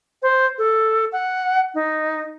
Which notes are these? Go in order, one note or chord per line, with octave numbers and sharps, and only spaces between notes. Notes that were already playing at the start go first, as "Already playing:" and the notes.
C5
A4
F#5
D#4